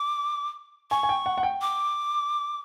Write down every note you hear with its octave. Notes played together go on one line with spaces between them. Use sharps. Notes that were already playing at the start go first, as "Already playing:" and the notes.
Already playing: D6
G#5 C#6
G#5
G5
F#5
F#5
G5
D6